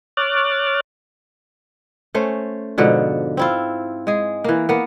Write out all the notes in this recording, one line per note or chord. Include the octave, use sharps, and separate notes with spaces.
C#5 D6 F6 F#6 A6
A3 C#4 C5
G#2 B2 D3 F3
C4 E4 F4
G#3 G#4
E3 A#3
A#3 B3